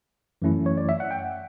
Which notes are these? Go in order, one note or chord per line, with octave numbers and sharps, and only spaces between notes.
F#2 E3 A3 C#4 E4
C#5
D5
E5
F#5
G5